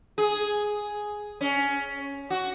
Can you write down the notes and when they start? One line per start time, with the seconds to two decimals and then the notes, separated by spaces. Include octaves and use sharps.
0.18 G#4
1.41 C#4
2.30 F#4